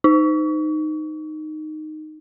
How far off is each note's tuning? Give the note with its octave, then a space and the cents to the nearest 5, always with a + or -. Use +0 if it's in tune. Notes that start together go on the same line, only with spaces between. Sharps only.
D#4 -10